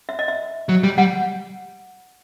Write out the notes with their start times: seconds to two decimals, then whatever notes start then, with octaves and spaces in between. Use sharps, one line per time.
0.09 E5
0.19 D#5
0.28 E5
0.69 F#3
0.83 G3
0.98 G3 F#5